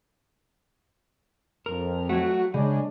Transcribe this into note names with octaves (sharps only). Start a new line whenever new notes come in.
F2 A#4
F#3 A3 F#4
C#3 G#3 D4 C#5 D5